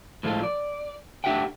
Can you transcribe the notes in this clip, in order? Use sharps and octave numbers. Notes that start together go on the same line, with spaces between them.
A2 F3 G#3 F4 A4
D5
A3 D4 G4 E5 F#5 G5